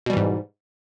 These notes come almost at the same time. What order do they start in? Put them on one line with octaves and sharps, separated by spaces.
B2 G3 E3 G#2